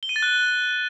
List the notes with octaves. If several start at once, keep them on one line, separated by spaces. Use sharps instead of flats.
G7
D#7
A6
F#6